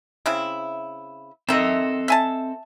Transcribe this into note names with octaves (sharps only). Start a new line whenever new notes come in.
C#3 C4 E4
D#3 C4 A4 D#5 E5
E5 G#5 A5